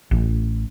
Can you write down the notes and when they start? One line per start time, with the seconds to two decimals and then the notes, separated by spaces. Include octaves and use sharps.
0.11 A1